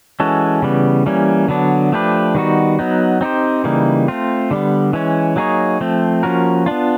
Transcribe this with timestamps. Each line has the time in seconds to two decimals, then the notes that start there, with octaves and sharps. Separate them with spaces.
0.20 E3 G#3 C#4 F#4 A4
0.62 C#3 E3 G3 B3
1.06 E3 G3 A#3 C#4
1.49 D3 F#3 B3 D4
1.92 F3 A3 D4 G4 B4
2.35 D#3 G3 B3 D#4 F#4
2.79 F#3 B3 D#4
3.21 C4 D#4 G4 C5
3.64 C#3 E3 G3 A#3 D#4
4.08 A3 C4 F4
4.51 D3 G3 B3
4.93 E3 G#3 C#4
5.36 F#3 A#3 D#4 G#4 C#5
5.80 F3 A3 C4
6.23 F3 A#3 C#4 F#4 A#4
6.66 B3 D4 F4